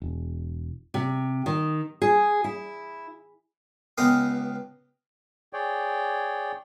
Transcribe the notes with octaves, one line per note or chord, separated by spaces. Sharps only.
E1
C3
D#3
G#4
E4
C#2 B3 G4 D#5 F5 D#6
G#4 C#5 D5 G5